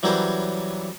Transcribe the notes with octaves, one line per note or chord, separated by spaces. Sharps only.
E3 F#3 G3 C#4 A#4 C5